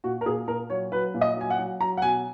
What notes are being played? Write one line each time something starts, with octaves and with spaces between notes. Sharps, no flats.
A#2 F#4
A#4
A#2 G#4
A#2 A#4
F#3 C#5
F#3 B4
A#2
D#5
F#3 G#5
F#5
F#3
F#3 A#5
F#5
B2 G#5